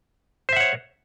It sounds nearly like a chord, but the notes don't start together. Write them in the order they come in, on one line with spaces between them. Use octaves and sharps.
C5 E5 F#5 C#5